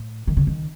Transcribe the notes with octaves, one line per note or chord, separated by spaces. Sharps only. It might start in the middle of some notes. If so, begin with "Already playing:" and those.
Already playing: A2
D#3
C#3
D#3